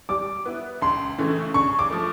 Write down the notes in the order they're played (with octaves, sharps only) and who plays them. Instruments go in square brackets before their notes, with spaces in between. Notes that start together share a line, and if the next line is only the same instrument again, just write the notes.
[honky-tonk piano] G3 [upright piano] D6
[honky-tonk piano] B3 E4
[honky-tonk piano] C#2 [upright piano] C6
[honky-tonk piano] C#3 E3 A3 C#4
[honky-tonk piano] C#3 [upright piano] C#6
[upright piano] D6
[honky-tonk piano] F3 A3